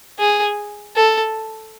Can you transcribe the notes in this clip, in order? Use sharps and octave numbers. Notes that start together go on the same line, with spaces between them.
G#4
A4